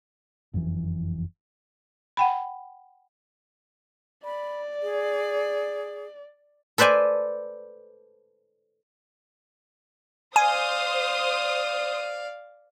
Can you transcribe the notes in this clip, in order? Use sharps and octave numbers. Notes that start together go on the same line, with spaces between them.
F#1 F2 B2 E3
F#5 G5 B5
D5 B5
G#4
A4 B4 C5 D5 G#5
C5 D5 F5 G#5 D#6